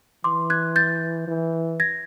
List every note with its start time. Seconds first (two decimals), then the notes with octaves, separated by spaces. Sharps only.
0.24 E3 C6 D6
0.50 F#6 G#6
0.76 G6 A6
1.28 E3
1.80 G#6 A#6